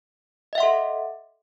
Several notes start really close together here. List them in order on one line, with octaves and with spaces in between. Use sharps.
D#5 E5 F#5 C6 A4